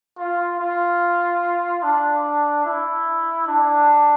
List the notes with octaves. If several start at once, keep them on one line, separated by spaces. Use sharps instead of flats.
F4
F4
D4
E4
D4